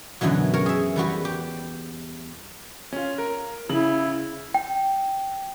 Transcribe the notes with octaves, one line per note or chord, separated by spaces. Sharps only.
F#2 B2 D3 E3 F#3
A#4 C#5
G#4 E5
E2 G3 F#4 B4
G4
C#4 F4
A#4
C#3 E4 F#7
G5